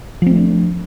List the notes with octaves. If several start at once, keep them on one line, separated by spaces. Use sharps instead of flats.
F3 A3 C4 D4